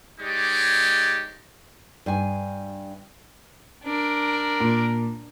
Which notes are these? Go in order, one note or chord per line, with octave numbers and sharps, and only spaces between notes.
G#3 D#4 G4 C#5 D5
G2 G#5
D4 A#4
A#2